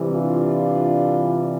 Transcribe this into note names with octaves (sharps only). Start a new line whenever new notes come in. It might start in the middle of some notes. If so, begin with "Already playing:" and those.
Already playing: C3 E3 G3
D4 F4